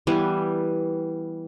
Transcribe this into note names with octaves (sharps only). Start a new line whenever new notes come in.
E3 G3 B3 G#5